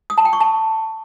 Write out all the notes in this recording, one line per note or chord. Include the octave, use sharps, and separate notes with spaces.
D#6
A5
G5
C#6
A5